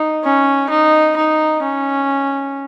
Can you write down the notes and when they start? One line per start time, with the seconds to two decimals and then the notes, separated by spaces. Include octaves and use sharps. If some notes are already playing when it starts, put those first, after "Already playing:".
Already playing: D#4
0.24 C#4
0.70 D#4
1.16 D#4
1.62 C#4